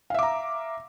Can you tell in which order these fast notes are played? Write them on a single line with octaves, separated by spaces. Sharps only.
F5 E5 D6 A#5